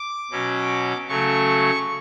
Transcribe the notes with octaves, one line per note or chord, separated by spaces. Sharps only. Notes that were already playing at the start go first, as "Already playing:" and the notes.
Already playing: D6
B2 F#3 C#4
C#3 F#3 A3 C#6